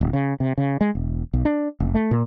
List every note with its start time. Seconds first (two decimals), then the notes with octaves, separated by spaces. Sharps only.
0.01 D1
0.13 C#3
0.40 C3
0.58 C#3
0.81 G#3
0.95 E1
1.33 B1
1.45 D4
1.80 F1
1.95 A3
2.11 A#2